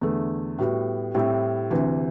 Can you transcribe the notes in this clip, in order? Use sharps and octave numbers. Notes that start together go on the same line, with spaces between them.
E2 D3 A3
A2 G3 B3 F#4
A2 G3 C4 E4
D2 C3 E3